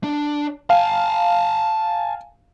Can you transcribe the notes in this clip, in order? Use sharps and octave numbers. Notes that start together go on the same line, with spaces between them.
D4
F5 G#5 A5